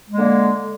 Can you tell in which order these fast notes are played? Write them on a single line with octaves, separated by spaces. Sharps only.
G#3 A#3 D3